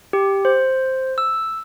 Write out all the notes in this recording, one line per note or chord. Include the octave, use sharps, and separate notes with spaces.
G4
C5
E6